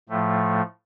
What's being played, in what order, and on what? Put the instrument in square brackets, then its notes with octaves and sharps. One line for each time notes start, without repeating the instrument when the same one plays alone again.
[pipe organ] A2 F3 A3